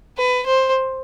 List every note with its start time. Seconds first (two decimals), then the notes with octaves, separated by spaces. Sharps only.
0.18 B4
0.46 C5